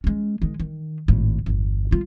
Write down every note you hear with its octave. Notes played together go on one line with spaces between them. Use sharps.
G#3 C#4
D#3 G#3
D#3
G#1 A2
G1 E2
G3 F4